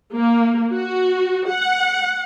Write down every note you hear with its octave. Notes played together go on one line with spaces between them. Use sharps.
A#3
F#4
F#5